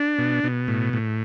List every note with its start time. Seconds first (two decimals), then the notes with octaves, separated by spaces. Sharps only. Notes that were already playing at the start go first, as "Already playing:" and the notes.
Already playing: D4
0.18 B2
0.44 B2
0.68 A2
0.93 A2